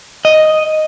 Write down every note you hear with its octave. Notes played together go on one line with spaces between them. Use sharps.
D#5